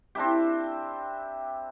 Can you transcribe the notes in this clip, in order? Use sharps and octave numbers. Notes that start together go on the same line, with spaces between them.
C4 D4 E4 G4